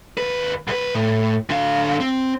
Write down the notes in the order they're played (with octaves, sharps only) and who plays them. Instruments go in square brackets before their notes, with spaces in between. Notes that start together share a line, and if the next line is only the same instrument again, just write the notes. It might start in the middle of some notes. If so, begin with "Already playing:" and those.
[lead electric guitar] D#2 B4
C2 B4
A2
D3 F5
C4